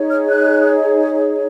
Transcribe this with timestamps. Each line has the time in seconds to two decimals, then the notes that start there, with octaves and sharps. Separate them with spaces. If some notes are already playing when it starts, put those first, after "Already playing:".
Already playing: D#4 G#4 C#5
0.10 F6
0.29 F#6